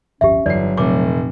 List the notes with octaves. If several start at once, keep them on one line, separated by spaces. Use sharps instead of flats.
D1 G1 F2 C#4 G4 E5
G1 E3 F#3 D5 C7
F1 A#2 E3 A3 C4 D6